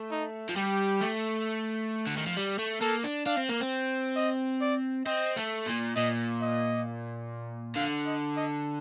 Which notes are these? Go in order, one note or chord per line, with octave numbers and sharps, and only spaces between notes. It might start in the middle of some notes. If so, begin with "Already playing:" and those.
Already playing: A3
D#4
F3
G3 G4
A3
D3
D#3
F3
G3
A3
A#3 A4
D4
D4 F5
C4
A#3
C4
D#5
D5
C4 D#5
A3
A#2
A#2 D#5
D#5
D3 F5
D#5
D#5